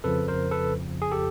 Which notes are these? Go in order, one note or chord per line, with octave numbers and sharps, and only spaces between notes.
F2 C#3 F3 A4 B4
A#4 C5
A4 B4
G#4
G4 A4